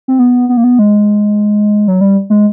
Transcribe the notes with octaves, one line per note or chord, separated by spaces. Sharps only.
C4
B3
B3
A#3
B3
G#3
F#3
G3
G#3